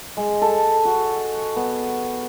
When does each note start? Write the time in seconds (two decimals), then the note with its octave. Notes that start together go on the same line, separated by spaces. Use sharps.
0.17 G#3
0.42 A4
0.85 F#4
1.56 B3